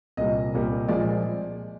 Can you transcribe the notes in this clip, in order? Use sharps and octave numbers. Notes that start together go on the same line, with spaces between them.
C2 A#2 G3 A#3 D#5
C2 A#2 G3 A#3
A#2 F3 G#3 D5